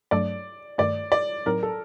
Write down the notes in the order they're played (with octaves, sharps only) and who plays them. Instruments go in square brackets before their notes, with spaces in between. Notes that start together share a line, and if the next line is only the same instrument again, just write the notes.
[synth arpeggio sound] G2 F#3 A3 D4 A4 [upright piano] D5
[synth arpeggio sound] G2 D#3 A3 [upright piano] D5
[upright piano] D5
[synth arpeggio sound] A2 F#3 C4 D#4 [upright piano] A#4
[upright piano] A4